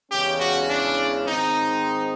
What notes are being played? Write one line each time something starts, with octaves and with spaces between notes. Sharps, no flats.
E2 C#3 E3 G#3 C#4 G4
F#4
D4
G#2 D#3 G#3 C4 D#4